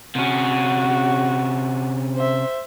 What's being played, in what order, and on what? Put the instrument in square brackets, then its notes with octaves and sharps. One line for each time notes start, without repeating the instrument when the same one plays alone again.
[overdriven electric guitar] C3 C#4 [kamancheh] F#4
[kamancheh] C5 E5